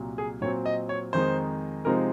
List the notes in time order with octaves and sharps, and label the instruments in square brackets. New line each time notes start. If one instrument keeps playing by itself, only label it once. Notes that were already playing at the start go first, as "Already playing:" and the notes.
Already playing: [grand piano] C2 A#2 F#3
G#4
A#2 F#3 C4 C#5
D#5
C#5
F2 D#3 G#3 D#4 C5
C3 F3 G#3 C4 D#4 A#4